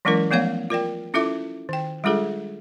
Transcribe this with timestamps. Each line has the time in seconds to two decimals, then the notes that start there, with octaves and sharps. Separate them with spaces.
0.05 E3 F#3 G#3 C#4 E4 A#4
0.31 F3 A3 B3 C#5 F5
0.70 F4 A#4 D5 G5
1.14 C#4 E4 F4 A4 E5 D6
1.69 D#3 G5
2.04 G3 G#3 D4 F4 G#4 A4